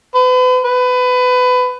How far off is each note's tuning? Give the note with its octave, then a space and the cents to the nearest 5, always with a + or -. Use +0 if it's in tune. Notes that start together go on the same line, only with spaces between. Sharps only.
B4 +40
B4 +25